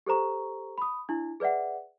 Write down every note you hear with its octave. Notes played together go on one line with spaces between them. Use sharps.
G4 A4 C5 A#5 C#6
B5 D#6
D4 E4
G#4 B4 D5 E5 F#5